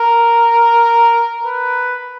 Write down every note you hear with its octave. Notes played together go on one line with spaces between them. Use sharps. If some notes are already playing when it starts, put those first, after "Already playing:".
Already playing: A#4
B4